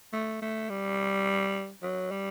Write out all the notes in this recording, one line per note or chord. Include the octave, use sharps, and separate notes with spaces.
A3
A3
G3
F#3
G3